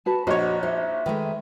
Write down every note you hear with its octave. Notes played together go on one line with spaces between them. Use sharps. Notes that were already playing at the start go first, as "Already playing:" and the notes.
F#4 B4 A5
A#1 D4 F#4 C5 C#5 D#5
D#4 C5 E5
D#3 G#3 A3 B4